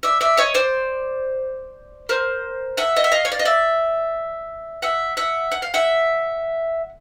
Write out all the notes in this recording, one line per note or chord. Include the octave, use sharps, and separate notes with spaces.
D5 E5
D5 E5
C#5 D#5
C5 D5
A#4 C5
E5 F#5
D#5
E5
D#5 F5
C#5
D5
D#5
D5 E5
E5 F#5
E5 F#5
F#5
F5
E5 F#5